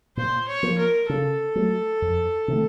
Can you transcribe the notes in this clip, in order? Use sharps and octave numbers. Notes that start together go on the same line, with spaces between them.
A#2 C5
C#5
F3 A#3
A#4
C#3 A4
F#3 A3
F2
C3 D#3 A3